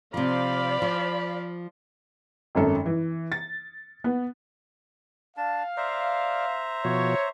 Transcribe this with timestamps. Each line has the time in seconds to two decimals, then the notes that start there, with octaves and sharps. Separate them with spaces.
0.14 C3 F3 C5 D5 F5 B5
0.82 F3
2.55 G#1 F#2 A4
2.86 E3
3.32 A6
4.04 B3
5.37 D4 F5 A5
5.77 C5 D5 E5 A#5
6.85 B2 F3 F#4 C#5